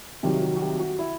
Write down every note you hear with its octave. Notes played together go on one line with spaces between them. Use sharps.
C2 C3 D#3 F#3 G4
F#4
F#4
G4
F#4
E4